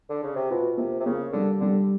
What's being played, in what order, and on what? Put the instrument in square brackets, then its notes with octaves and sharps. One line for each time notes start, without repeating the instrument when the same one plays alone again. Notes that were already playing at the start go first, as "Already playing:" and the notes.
[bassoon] D3
C#3
C3
[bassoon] B2 [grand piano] F4
[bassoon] C3 [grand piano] A#3
[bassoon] C3
[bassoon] C#3 [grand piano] A#3
[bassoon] D3 [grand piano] G3
[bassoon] D3 [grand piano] G3